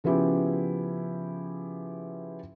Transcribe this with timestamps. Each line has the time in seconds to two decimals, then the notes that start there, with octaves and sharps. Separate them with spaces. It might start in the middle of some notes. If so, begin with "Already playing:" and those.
0.04 C#3 F3 B3 C#4 E4 G4